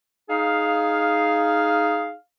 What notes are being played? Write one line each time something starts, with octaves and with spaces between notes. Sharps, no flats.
D#4 G#4 F5